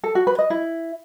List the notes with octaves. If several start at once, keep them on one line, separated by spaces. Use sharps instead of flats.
A4
F#4
B4
D#5
E4